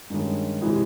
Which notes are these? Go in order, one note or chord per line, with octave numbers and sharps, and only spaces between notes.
G2 D#3 G#3 C#4
C3 E3 G#3